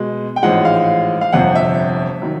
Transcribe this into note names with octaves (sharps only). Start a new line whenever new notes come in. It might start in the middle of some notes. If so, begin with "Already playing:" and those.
Already playing: B2 G#3
G5
A1 G#2 F3 G#3 F#5
F5
F5
G1 F2 C3 F#5
E5
D#3 F#3